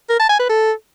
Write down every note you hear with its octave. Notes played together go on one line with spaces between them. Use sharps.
A#4
A5
G#5
B4
A4